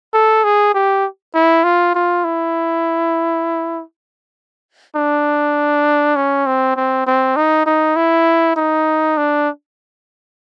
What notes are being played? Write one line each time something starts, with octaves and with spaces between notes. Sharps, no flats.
A4
G#4
G4
E4
F4
F4
E4
D4
C#4
C4
C4
C4
D#4
D#4
E4
D#4
D4